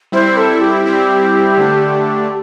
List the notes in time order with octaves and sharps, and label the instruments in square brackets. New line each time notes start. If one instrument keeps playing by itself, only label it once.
[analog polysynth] G3 C4 E4 [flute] C5
[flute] A4
G4
[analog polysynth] G3 C4 E4
D3 A3 D4